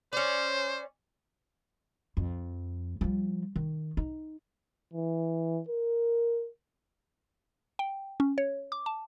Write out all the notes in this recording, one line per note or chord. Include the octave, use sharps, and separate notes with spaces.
C#4 C5 D5
F2
F3 G3
D#3
D#4
E3
A#4
G5
C#4
C#5
D6
A5